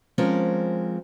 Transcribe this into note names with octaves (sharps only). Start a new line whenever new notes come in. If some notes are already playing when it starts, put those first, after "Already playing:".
F3 G#3 C4 C#4 A#4